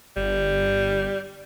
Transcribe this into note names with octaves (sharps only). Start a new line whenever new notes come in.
G1 G3